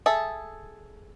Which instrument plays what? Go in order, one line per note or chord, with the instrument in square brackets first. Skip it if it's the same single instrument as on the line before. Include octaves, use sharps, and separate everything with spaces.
[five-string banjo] G#4 A4 E5